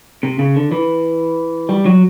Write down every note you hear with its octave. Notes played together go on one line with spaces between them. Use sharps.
C3
C#3
D3
E3
G3
F#3